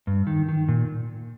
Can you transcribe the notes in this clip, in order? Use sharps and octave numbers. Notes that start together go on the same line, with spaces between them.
G2
D#3
D#3
A#2